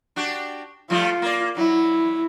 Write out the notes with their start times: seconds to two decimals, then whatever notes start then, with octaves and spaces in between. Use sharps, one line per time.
0.16 D4 F#4 G4
0.90 F3 G3 A3 F4
1.22 A#3 D5
1.57 F#3 E4